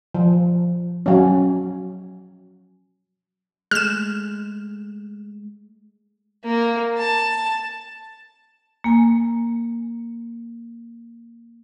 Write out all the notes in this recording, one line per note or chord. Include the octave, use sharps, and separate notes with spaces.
F3
F#3 C#4
G#3 A3 F6 E7
A#3
A5
A#3 G#5